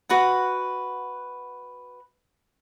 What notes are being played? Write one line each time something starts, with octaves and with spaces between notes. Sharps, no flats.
F#4 B4 F#5